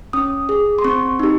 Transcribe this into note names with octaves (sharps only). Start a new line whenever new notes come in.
C#4 D#6
G#4
C6
C4 C#6
D#4 G4